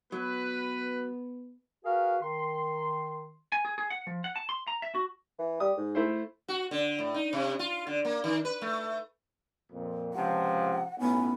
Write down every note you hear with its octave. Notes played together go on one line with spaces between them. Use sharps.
F#3 B3 B4
F#4 G#4 A#4 B4 F5
D#3 C6
G#5
G#4
G#4
F#5
F3
F#5
A5
C6
A#5
E5
F#4
E3
G3 D#6
G#2
A3 E4 C5
F#4
D3
A2
D#4
C3
F4
D3
A#3
D#3
B4
A3
F2 A#2
C#2 C3 F3 F#5
B1 A2 B3 C#4